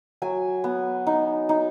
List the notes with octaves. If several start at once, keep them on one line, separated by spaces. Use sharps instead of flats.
F#3 G#5
B3
D#4
D#4